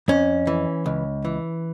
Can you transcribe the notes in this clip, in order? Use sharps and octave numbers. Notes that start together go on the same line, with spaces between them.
F2 C#4
E3
C#2
E3